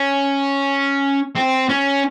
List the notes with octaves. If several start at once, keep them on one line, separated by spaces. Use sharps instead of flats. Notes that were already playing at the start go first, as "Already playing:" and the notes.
Already playing: C#4
C4
C#4